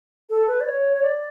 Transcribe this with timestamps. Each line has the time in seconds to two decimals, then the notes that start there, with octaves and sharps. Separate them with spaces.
0.30 A4
0.48 B4
0.60 D5
0.66 C#5
0.93 C#5
1.02 D5